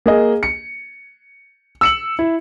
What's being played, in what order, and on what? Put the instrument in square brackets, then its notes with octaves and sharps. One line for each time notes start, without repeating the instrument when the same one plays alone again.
[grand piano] A#3 G#4 D#5
C#7
E6 C#7 F#7
E4